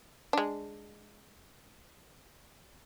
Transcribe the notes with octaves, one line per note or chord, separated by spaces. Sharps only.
G#3 D4